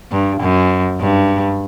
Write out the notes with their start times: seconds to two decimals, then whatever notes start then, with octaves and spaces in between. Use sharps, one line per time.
0.12 G2
0.41 F#2
1.00 G2